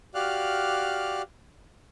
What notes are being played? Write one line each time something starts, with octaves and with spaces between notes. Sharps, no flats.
F#4 G4 D5 F5 F6 F#6